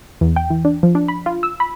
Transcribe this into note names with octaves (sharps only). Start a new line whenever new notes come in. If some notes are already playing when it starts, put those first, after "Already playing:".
E2
G5
E3
D4
F3
D4
B5
F4
E6
B5